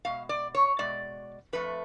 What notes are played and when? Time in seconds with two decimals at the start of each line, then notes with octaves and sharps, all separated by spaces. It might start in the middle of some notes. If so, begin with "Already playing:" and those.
0.05 B2 G#3 F5
0.29 D5
0.55 C#5
0.79 B2 G#3 D5
1.53 F2 F3 A3 B4